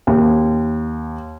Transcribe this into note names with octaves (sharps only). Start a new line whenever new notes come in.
D#2